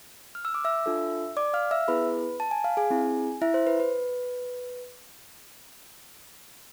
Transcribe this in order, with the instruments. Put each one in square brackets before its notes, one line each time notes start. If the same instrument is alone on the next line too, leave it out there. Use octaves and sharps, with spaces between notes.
[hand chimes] F6
E6
D6
E5 E6
D4 F4 A4
D5 D6
F5 F6
E5 E6
B3 E4 G#4 B4 B5
A5
G#5
F5
G#4 G#5
C4 E4 G#4
E4 E5
C5
B4
B4